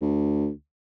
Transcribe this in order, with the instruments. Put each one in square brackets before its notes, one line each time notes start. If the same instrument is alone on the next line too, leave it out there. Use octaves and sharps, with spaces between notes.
[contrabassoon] D2